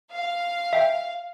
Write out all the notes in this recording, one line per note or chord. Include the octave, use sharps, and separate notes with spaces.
F5
E5 G5